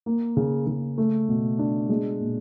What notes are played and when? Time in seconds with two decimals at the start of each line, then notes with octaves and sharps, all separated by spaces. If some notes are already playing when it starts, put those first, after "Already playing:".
0.06 A#3
0.37 C#3
0.67 C#3
0.98 A3
1.28 B2
1.59 D4
1.89 G#3
2.20 A#2